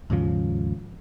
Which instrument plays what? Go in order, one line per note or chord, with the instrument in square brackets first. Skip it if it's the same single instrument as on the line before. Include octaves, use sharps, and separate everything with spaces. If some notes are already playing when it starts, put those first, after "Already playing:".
[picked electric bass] D#2 G#2 C#3 F3